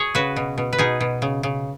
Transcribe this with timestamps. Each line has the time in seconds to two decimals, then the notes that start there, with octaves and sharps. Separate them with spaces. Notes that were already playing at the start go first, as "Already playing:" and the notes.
Already playing: G#4 C#5
0.15 C#3 F#4 B4
0.36 B2
0.58 B2
0.73 B4
0.78 B2 D#4 G#4
1.01 B2
1.22 C#3
1.43 C#3